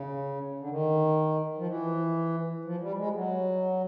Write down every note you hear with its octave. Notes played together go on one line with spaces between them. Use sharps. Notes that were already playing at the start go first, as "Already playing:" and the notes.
Already playing: C#3
D3
D#3
F3
E3
F3
G3
G#3
F#3